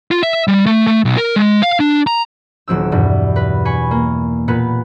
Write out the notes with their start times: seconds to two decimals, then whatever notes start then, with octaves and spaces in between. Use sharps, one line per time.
0.11 F4
0.23 E5
0.48 G3
0.66 A3
0.87 A3
1.05 B1
1.17 A#4
1.36 G#3
1.63 F5
1.80 D4
2.07 A#5
2.68 D#1 F#3 C4 E6
2.92 E2 G2 B2
3.36 B4
3.65 G#5 B5 C#6
3.91 A#3
4.48 A#2 B3 B4